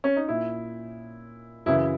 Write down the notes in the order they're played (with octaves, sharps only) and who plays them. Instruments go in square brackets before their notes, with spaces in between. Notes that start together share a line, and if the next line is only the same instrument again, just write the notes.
[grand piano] C#4
D#4
A#2 E4
F#2 C#3 E3 E4